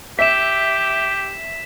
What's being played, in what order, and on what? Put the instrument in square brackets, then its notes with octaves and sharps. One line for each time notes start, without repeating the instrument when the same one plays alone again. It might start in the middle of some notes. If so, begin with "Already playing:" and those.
[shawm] G4 [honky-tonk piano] E5 [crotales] B6 E7